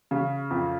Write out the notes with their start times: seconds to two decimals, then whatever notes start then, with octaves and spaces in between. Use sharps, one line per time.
0.11 C#3
0.50 F2